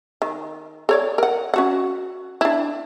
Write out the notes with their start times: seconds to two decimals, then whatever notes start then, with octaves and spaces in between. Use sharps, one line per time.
0.22 D#3
0.89 A4 C#5 D5
1.18 A#4 F#5
1.54 C#4 F#4 F#5
2.41 D4 E4